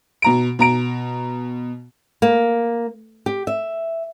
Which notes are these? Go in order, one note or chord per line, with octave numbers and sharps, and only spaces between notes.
B2 A#5 D7
B2 A#5 D7
A#3
G4
E5